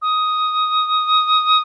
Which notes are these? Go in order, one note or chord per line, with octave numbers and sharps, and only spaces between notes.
D#6